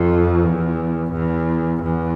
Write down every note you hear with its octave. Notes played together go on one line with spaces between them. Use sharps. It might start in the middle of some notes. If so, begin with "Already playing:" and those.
Already playing: F2
E2
E2
E2